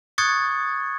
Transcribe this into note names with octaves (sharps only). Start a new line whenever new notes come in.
C#6 D#6 F#6 G#6 A6 C#7